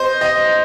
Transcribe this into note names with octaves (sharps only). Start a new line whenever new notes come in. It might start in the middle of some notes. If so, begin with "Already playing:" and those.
Already playing: C5 D#5
D#5